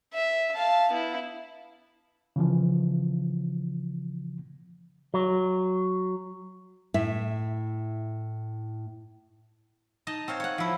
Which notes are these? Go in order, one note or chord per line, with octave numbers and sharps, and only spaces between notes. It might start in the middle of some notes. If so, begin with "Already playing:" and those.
E5
F5 A5
B3 E4
C#3 E3 F3
F#3
A2 E4 E5
D#4 D#5 A5
C4 C#5 F5
C#5 F#5
F3 E4